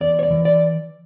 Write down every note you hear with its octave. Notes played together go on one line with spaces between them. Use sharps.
E2 D5
C#5
D5
E3
D5